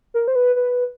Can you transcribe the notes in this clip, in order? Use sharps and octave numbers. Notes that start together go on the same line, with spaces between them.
A#4
C5
B4
B4